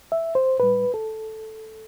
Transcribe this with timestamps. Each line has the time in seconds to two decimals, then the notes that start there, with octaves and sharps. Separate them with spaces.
0.12 E5
0.35 C5
0.59 A2 G3 B4
0.94 A4